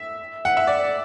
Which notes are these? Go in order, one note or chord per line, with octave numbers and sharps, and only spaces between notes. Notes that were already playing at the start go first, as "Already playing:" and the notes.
Already playing: E5
F#5
E5
D5